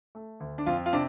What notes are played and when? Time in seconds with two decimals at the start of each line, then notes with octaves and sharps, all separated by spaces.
0.15 A3
0.40 D2
0.58 D4
0.66 F2 F4
0.86 F4
0.93 C3 D4